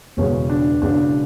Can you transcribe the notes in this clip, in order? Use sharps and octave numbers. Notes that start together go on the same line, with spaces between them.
E1 E2 C#3 G#3 C#4
D4
E1 E2 C#3 G#3 D4